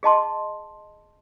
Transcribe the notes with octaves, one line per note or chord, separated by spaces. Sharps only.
G#4 D#5 A5 C6